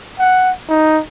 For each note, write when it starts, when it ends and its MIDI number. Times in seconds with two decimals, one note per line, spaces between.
0.19 0.51 78
0.69 1.00 63